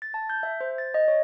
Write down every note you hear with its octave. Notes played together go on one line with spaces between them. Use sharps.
A6
A5
G6
E5
C5
A6
D#5
C#5